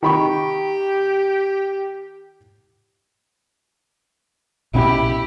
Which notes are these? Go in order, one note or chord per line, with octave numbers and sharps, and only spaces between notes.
D#3 G4 B5 C#6
A#1 B2 C#4 E4 G4